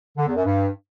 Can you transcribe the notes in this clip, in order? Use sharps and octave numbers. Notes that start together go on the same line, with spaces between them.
D3
E2
F#2
G2